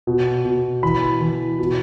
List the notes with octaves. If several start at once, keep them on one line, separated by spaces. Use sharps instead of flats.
B2
B2
E3 B5
E3
B2